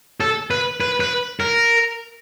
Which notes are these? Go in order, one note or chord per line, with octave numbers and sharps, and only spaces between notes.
A4
B4
B4
B4
A#4